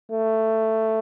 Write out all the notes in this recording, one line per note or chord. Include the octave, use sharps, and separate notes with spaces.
A3